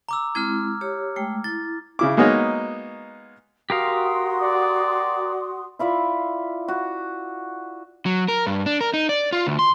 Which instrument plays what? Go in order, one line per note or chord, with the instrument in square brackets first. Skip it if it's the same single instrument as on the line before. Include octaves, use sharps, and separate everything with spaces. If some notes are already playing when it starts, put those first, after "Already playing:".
[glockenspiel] A#5 D6 E6
[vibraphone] G#3 C4 E4 [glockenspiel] F6 G#6
[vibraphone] G4 C#5
G#3 A3 G5
[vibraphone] E4 [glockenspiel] A6
[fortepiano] C#3 E4 D6
G#3 A#3 B3 D#4 F#4 C#5
[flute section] F#4 C6 D#6 [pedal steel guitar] G4 A#4 F5
[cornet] D5
[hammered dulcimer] E4 F4 D5 E5
F#4
[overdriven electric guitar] F#3
A#4
G2
D4
A#4
D#4
D5
F4
D2
C6